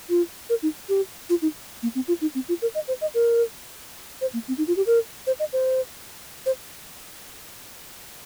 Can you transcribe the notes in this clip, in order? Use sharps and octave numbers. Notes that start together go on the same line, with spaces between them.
F4
A#4
D#4
G4
F4
D#4
A#3
C4
F4
D#4
C4
F4
A#4
D#5
C5
D#5
A#4
C5
A#3
C4
D#4
F4
G4
A#4
C5
D#5
C5
C5